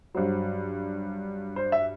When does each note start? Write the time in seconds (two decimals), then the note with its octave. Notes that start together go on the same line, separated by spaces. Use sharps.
0.14 G2 F#3 C5
1.56 C5
1.72 E5